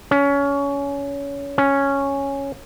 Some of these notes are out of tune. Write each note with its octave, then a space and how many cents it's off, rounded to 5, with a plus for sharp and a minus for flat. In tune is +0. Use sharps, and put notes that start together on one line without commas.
C#4 +25
C#4 +0